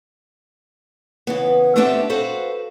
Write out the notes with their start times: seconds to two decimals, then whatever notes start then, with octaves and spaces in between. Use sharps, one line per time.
1.27 C#3 E3 B3
1.76 A3 B3 C4 D4 G4 E5
2.10 F#4 A4 B4 C5 F5